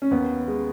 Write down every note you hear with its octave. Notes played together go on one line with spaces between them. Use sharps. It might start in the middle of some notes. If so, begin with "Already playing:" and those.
C#4
D#2 B3
G#3